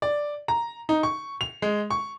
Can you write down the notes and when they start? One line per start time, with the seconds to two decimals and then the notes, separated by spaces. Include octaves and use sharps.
0.02 D5
0.48 A#5
0.89 D#4
1.03 C#6
1.41 F7
1.62 G#3
1.91 C#6